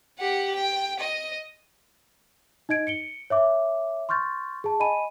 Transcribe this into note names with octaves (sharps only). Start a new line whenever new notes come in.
G4 F#5
G5
D#5
D#4 D#5 G#6 D7
C#7 D7 G7
C#5 E5 D6
C6 C#6 F6 G6 A6
G#4 A5
D#5 G#5 B5 D#7